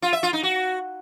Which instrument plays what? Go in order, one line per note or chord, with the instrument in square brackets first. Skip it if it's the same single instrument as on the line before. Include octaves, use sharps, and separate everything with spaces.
[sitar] F4
E5
F4
D#4
F#4